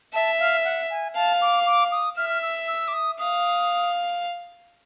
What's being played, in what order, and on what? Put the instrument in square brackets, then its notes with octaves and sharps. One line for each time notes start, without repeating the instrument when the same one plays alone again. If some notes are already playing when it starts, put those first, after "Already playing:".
[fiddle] E5 [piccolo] A5
[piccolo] F5
F#5
G#5
[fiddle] F5 [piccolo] A5
[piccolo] D6
D6
D#6
[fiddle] E5 [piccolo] F6
[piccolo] F6
E6
E6
D6
D#6
[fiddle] F5 [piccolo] D#6